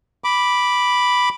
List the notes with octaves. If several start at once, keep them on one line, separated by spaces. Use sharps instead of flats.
B5 D6